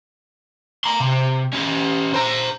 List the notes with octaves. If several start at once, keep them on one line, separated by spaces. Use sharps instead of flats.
A#5 C6
C3
C#4 G4
C5 A#5